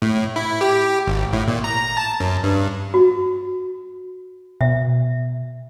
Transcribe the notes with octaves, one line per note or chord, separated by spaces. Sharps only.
A2
E4
G4
G#1
A2
A#2
A#5
A5
F#2
G2
F#4
B2 E5